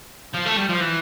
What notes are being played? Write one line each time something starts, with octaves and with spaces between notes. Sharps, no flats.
F3
A3
G3
F3
E3